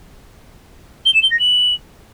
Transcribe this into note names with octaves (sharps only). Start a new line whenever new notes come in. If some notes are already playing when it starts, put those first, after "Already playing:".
G7
E7
G7
A#6
F#7